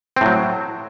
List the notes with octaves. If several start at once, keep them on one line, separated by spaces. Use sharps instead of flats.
A2 F#3 C4